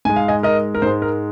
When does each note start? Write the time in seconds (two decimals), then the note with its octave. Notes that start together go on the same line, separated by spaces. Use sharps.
0.05 G#2 G#3 G#5
0.16 F5
0.28 D#5 G#5
0.43 A#4 D#5
0.75 A#4
0.82 G#2 G#3 C5
1.02 A#4